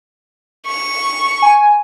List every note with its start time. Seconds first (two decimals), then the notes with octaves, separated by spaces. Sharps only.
0.67 C#6
1.42 G#5